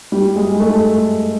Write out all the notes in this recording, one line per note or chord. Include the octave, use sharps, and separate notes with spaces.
G3
G#3
A3